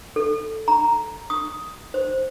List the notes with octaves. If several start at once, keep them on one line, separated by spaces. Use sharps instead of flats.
A4
A#5
D#6
C5